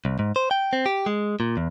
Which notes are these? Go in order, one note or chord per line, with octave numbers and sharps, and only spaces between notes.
C2
G#2
C5
G5
C4
G4
G#3
A#2
E2